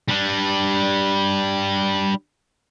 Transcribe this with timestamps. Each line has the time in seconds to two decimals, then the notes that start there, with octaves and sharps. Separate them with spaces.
0.08 G3 D4